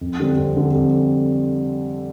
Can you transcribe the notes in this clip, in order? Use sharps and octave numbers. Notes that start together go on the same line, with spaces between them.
F2
D3 G3 C4
F2
D3 G3 C4
F2